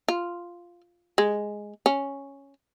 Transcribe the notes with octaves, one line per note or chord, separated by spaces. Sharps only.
F4
G#3
C#4